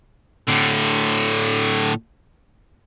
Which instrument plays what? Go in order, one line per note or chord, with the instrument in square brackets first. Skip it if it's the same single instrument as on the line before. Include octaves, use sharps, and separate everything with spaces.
[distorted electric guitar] A2 D3